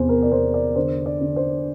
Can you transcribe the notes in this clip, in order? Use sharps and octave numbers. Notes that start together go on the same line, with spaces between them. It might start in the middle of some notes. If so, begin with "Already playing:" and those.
Already playing: E2 C3 C5
A#4
D5
E2 C5
D5
D3 C5
D5
D3
C5